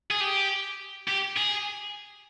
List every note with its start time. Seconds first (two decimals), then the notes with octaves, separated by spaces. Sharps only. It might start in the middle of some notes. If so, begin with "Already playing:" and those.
0.11 G#4
0.20 G4
1.08 G4
1.37 G#4